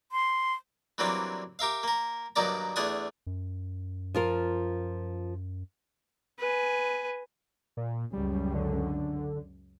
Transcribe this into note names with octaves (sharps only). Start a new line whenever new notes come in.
C6
E3 F#3 G3 A#3 C4 D4
G4 A#4 E5 F5
A#3 A#4
G2 D#3 F#3 A#3 D5 A#5
E2 A3 D4 F#5 G#5 D#6
F#2
F3 F4 A#4
B4 G#5
A#2
C#2 F#2 G3
D3